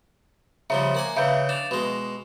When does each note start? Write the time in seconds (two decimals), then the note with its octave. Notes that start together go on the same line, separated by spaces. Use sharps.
0.70 C#3 F3 G3 E5
0.95 A#3 F#5 G#5
1.17 C#3 E3 E5 F5 G6
1.49 D4 E7 F7
1.71 B2 G#3